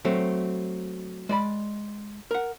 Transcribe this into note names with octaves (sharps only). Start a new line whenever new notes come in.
F#3 A3 C4
G#3 D5 B5
A#4 F#5